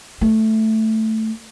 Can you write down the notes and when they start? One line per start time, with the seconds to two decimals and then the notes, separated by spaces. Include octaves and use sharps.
0.21 A3